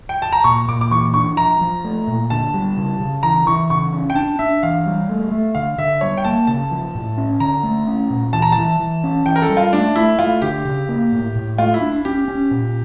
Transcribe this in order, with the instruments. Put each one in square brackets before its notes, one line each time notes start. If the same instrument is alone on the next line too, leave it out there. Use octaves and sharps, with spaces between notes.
[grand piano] G5
A5
A#5
[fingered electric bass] A#2 [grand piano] C#6
[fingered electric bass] A#2 [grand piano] D6
[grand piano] D6
[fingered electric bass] E3 [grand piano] C#6
[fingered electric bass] D4 [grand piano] C#6
[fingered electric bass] F3 [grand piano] A#5
[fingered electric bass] F3
A3
A#2
[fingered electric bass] D3 [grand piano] A5
[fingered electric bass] G3
C#3
C#3
[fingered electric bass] E3 [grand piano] A#5
[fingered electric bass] E3 [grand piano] C#6
[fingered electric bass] C#3 [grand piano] C#6
[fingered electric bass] C#4
[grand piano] G5
[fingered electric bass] D4 [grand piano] A5
[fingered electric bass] D4 [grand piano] E5
[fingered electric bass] E3 [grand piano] F5
[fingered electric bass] G3
A3
A3
[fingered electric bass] D3 [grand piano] F5
[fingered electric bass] D3 [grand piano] E5
[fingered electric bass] G3 [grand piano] C#5
[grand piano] G5
[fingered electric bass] A#3 [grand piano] A5
[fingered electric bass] C#3 [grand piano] A5
[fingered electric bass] F3
A2
C#4
[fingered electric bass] D3 [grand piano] A#5
[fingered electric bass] A3
C#4
A#2
[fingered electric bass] E3 [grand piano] A5
[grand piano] A#5
A5
[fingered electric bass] E3
E3
C#4
[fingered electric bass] E3 [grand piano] G5
[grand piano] A#4
A4
[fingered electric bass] G3
[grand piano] F4
[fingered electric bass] A3 [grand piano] D4
[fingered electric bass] A3 [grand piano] E4
[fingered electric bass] A3 [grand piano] F4
[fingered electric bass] D3 [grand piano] G4
[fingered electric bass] C#3
A#3
A2
A2
[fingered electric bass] A3 [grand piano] F4
[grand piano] E4
[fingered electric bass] D4
[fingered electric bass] C#4 [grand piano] G4
[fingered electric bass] C#4
A#2